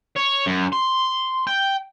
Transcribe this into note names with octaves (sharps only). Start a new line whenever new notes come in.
C#5
F#2
C6
G5